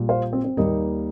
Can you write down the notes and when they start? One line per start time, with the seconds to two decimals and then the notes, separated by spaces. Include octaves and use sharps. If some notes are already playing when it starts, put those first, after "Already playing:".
Already playing: A#1 A#2 G3
0.09 C5 F5
0.33 C4
0.44 C4
0.57 D#2 D#3 G3 A#3 D#4